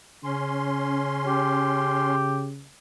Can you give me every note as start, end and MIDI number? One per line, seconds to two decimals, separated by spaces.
0.24 2.66 49
0.24 2.15 61
0.24 2.15 84
1.27 2.48 67